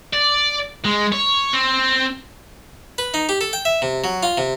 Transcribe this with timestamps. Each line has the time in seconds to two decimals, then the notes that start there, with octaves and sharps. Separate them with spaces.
0.13 D5
0.85 G#3
1.12 C#5
1.53 C4
2.98 B4
3.14 D#4
3.29 G4
3.41 A4
3.53 G5
3.65 E5
3.82 C3
4.04 F#3
4.23 F4
4.38 C3